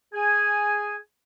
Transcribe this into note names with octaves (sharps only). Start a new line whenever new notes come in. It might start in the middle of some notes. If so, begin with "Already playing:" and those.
G#4 G#5